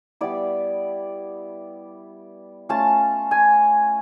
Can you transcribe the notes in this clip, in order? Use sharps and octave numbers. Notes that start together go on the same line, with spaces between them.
G3 B3 E4 D5
A3 C#4 F4 A5
G#5